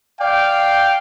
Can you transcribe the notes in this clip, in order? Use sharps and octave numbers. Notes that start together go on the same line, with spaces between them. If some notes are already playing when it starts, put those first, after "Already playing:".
D5 F5 G5